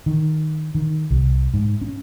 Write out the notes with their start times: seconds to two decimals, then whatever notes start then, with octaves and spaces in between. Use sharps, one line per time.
0.06 D#3
0.75 D#3
1.10 C2
1.54 G#2
1.81 C#4